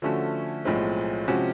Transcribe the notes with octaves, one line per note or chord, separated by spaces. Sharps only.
D3 F3 A3 C#4 F#4
B1 A2 F3 G#3 C4
C3 F3 G#3 C#4 F#4